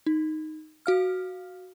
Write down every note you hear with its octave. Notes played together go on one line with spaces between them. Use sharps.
D#4
F#4 F5 F6